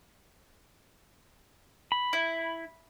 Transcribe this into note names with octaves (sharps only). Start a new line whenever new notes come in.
B5
E4